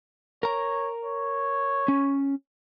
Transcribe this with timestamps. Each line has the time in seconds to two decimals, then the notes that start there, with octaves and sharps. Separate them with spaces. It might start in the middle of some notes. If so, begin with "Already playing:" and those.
0.43 A#4 C#5 A#5
1.05 C#5
1.88 C#4